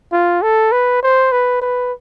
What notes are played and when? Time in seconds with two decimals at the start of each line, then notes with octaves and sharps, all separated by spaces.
0.12 F4
0.42 A4
0.72 B4
1.03 C5
1.32 B4
1.61 B4